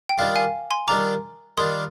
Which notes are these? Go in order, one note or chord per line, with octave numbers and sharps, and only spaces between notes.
G5
D#3 G3 D4 F4 F5
F5 G#5
G#5 C6
D#3 G3 D4 F4 A#5 D6
D#3 G3 D4 F4 C6 D#6